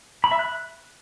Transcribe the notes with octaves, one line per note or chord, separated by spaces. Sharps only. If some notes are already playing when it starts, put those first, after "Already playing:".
B5
E5
F#6